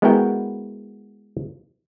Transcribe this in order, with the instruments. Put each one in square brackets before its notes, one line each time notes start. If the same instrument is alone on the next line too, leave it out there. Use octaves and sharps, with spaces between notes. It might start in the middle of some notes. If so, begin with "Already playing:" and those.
[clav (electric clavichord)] G#3 B3 E4 F#4 A#4 G5